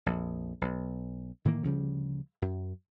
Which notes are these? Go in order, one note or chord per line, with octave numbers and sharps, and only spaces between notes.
A#1 F2
B1
A2 D#3 E3 A#3
D2 C#3 F3 G3
F#2